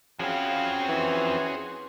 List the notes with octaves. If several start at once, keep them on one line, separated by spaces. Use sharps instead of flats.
F3 C4 C#4 E4 F#4 G#4 F5
E3 C6